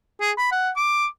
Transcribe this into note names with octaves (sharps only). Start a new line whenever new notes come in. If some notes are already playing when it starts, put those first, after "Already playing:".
G#4
B5
F#5
D6